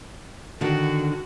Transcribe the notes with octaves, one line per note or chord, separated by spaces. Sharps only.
D3 D#3 F#4